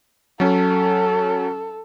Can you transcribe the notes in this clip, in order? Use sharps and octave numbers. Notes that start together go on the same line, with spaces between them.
F#3 C#4 A4